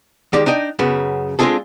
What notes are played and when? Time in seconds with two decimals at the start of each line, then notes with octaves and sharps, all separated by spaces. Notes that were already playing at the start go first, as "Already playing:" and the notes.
0.33 D#3 G#3 G4 D5
0.46 D4 D#4 D#5 G5
0.79 F#2 C#3 B3 F#4
1.39 G#3 C4 D4 F4 G#4 A4